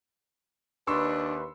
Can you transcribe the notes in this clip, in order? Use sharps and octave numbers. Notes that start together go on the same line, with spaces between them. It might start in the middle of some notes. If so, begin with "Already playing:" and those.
D#2 D4 B4 C6 C#6 E6